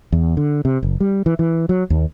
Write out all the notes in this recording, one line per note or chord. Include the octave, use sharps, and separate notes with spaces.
E2
D3
C3
F#1
G3
E3
E3
F#3
D#2